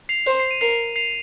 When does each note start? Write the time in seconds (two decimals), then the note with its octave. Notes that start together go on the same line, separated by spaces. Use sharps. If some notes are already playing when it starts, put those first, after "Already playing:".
0.09 C7 F7
0.27 C5
0.40 C7
0.51 D#7
0.61 A#4 C7 F7
0.96 C7 F7